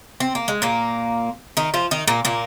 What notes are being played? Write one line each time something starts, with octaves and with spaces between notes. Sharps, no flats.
C4
A#3
G#3
A#2 A#3
D#3 D#4
F3 F4
D#3 D#4
A#2 A#3
A#2 A#3